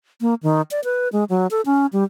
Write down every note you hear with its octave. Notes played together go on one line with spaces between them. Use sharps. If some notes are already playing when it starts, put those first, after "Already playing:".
A#3
D#3
D5
B4
G#3
F#3
A4
C#4
G3